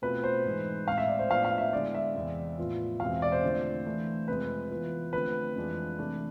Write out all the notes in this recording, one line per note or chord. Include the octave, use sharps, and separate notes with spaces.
B2 A3 C4 F4 B4
C5
G#2 E3 G#3
A2 G#3 C4 F5
E5
D5
C5
A2 F3 B3 D4 F5
F5
E5
D3 G#3 B3 E4 D5
E5
E2 C3 G#3 C4
A2 F3 B3 F4
E2 B2 G#3 C4 F5
D5
C5
D3 F3 A3 C4
E3 A3 D4
F2 C3 G#3 B4
E3 B3 F4
D3 F3 A3 C4 B4
F2 E3 G#3 D4 F4
C3 E3 A3 D4